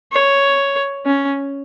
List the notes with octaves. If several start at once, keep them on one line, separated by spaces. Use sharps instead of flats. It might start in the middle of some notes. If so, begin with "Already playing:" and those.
C#5
C#4